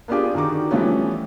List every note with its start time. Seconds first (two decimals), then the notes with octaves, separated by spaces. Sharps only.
0.08 A#3 B3 D4 F4 G4 G#4
0.34 D3 D#3 D#4 F#4 D6
0.71 E3 F3 G3 A3 B3 C#4